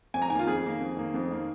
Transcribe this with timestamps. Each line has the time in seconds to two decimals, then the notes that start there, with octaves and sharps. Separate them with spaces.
0.14 F2 G#5
0.22 A#5
0.30 D#3 G#5
0.35 A#3 F4
0.47 F2 G#4
0.64 D#3 A#3
0.80 F2
0.97 D#3 A#3
1.14 F2
1.31 D#3 A#3